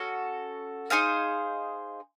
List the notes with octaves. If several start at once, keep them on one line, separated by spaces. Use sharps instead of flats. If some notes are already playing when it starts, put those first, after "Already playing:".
Already playing: C#4 F#4 A4
D#4 G#4 C5 F5